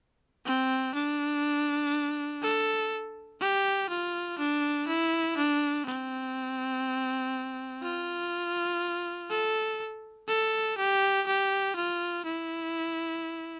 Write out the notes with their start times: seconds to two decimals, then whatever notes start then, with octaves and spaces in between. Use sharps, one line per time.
0.45 C4
0.94 D4
2.42 A4
3.40 G4
3.89 F4
4.38 D4
4.88 E4
5.37 D4
5.86 C4
7.82 F4
9.30 A4
10.28 A4
10.78 G4
11.26 G4
11.76 F4
12.25 E4